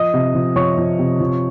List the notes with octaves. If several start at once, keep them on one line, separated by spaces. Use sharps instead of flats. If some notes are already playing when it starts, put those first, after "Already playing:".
Already playing: F3 D#5 D#6
C3
F3
F3 C#5 C#6
F3
C3
F3